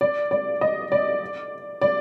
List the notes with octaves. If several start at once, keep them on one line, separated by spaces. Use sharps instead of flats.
D5
D5
D#5
D5
D5